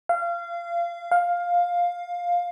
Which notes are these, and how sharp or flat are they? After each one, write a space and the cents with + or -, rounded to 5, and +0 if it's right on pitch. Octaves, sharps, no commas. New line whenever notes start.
F5 -25
F5 +10